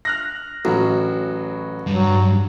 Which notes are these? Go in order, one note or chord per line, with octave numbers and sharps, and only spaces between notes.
F6 F#6 A#6
A1 F#3 E4 F#4
G2 F#3